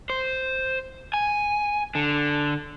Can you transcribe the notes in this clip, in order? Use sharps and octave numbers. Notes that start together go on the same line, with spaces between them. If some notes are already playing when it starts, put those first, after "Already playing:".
C5
G#5
D3